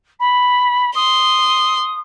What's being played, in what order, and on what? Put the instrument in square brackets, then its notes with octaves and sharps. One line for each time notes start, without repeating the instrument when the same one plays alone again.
[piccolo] B5
[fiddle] C6 [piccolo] D#6